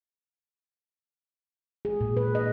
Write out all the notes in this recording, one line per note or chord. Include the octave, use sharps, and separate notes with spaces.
G#4
A#2
B4
D#5